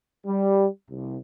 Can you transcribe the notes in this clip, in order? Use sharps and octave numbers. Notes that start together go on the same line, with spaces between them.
G3
C2